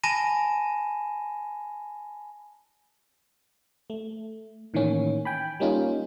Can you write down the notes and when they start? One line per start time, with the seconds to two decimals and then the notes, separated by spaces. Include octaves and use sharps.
0.03 G#5 A5 B5 A#6 D#7 E7
3.90 A3
4.74 A2 D#3 E3 A#3 C#4
5.25 G5 G#5 B5
5.60 G3 A#3 C#4 D#4 F4